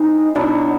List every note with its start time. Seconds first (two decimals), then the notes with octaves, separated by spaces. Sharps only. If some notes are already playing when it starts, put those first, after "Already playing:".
Already playing: G#3 C4 D#4 E4
0.35 B2 F#3 B3 D4 E4